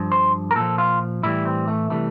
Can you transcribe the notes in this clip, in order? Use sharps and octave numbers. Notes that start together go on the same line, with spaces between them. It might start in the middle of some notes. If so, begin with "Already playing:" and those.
Already playing: G2 F3
C5
A#4
A#2 F3 A4
F4
A2 E3 G3 E4
C4
A3
C3 E3 G3 A3